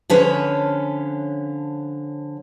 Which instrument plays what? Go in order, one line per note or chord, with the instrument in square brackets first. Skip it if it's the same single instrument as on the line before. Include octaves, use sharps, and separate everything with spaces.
[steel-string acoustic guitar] D3 F3 C#4 A4 B4 C#5